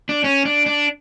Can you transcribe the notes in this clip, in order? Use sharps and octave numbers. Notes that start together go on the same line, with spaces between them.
D4
C#4
D4
D4